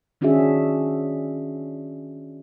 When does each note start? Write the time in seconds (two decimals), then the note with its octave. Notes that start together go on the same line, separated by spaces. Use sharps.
0.21 D#3 C#4 D4 F#4 G#4 E5